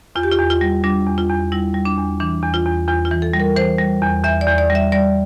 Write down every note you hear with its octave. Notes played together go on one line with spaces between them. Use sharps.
E2 F4
G4
F4
E2
F4
G3
G3 D4
E2
F4
E2
G3 E4
G3
D4
E2
E3 D4
E2
F4
E2
E2 F4
F4
E3
A4
G3
A#4
E3 C5
G3
E2
E2 E5
D5
E2
D5
G3
E5
G3 D5